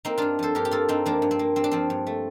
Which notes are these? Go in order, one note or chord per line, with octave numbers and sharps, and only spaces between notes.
A#3 C4 D#4
G2 D4 F4
F3 A4 C5
G2 G4 A#4
G4
A#3 F4 A4
G2 C4 D#4
F3 A#3 D4
G2
C4
A#3
G2 C4
D4
F3 C4
G2
A3